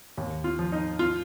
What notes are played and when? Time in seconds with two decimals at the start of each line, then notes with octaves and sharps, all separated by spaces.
0.17 D#2
0.44 F4
0.59 F3
0.72 D#4
0.99 F4